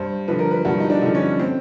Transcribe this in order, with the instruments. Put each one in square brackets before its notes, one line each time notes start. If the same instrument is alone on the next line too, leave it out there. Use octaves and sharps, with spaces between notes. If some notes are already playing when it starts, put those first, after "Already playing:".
Already playing: [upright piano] G2 C5
D3 F3 B4
A#4
B4
G2 F#4
D#4
D4
D3 F3
C#4
C4